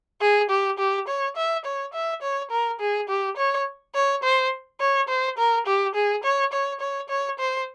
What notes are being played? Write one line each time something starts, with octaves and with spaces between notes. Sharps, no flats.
G#4
G4
G4
C#5
E5
C#5
E5
C#5
A#4
G#4
G4
C#5
C#5
C5
C#5
C5
A#4
G4
G#4
C#5
C#5
C#5
C#5
C5